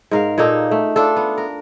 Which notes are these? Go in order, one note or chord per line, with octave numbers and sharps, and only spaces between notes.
G#2 A#4 F5
A#2 A#3 D#4 A4
A3
D4 F4 A4
B3
A#4